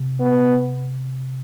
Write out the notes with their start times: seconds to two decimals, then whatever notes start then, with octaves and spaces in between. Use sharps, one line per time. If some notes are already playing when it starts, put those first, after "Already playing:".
Already playing: C3
0.20 B3